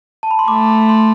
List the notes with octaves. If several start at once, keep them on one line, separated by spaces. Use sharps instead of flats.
A5
B5
C6
A3 D6
C6